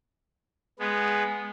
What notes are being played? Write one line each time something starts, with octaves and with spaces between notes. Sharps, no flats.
G#3 B3